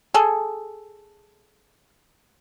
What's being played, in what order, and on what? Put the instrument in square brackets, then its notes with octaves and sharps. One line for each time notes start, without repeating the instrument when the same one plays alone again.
[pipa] G#4 A4